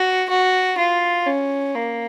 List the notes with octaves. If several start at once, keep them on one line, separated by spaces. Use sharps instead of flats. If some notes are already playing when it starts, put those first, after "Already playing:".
Already playing: F#4
F#4
F4
C#4
A#3